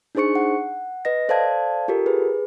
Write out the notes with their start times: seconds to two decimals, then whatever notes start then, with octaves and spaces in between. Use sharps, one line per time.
0.15 D4 D#4 G#4 C5 C#6 C#7
0.35 F#5
1.05 B4 D#5 A#6
1.29 A4 C5 D5 F5 A5 G#6
1.88 F4 G4 A4 A#4
2.06 G#4 B4